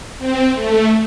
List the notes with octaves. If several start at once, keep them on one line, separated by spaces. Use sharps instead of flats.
C4
A3